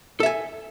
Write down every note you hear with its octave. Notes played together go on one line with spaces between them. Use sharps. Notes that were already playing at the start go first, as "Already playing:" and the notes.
A4 E5 G#5